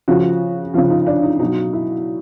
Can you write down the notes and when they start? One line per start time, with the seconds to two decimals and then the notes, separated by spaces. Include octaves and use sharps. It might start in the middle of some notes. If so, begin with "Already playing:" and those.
0.08 C#3 F3 F#4
0.74 F3 F4
0.77 C#3
0.90 D#4
1.07 D4
1.23 D#4
1.40 B2 F#3 D#4
1.73 E4